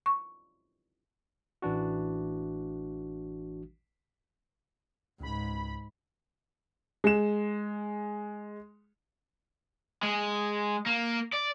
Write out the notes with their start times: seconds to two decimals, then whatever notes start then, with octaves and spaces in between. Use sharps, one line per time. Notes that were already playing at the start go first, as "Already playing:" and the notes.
0.06 C#6
1.62 A1 E3 D4 F#4
5.20 C#2 G#2 B5
7.04 G#3 E7
10.03 G#3
10.86 A#3
11.34 D5